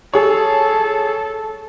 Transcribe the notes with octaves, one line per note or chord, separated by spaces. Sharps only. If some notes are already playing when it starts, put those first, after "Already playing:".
G#4 A4 C#5